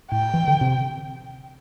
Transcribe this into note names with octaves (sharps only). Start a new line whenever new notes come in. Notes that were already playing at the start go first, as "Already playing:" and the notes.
A2 G5
E3
D3
C3